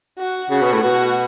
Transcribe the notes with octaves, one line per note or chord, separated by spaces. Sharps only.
F#4
C#3 F#4
B2
A2
B2 F#4